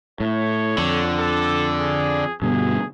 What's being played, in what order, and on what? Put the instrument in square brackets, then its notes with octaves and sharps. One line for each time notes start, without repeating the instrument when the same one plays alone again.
[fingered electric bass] A2 [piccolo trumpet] C#5
[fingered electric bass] F2 [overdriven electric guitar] D3
[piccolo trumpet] A4
G#4
[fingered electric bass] G2 B2 D3 [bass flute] B3 [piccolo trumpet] G#4